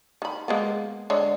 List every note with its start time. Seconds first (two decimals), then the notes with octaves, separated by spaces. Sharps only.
0.22 D#3 B5
0.48 G#3 A#3 B3
1.10 D3 G#3 C#5